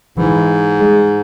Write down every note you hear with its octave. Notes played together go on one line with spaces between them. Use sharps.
G#2 E3
G#3